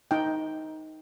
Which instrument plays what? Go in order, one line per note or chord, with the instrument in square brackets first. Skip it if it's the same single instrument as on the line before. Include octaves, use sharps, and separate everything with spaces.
[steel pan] D#4 G5